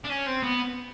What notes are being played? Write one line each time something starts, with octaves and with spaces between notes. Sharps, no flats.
D4
C#4
C4
B3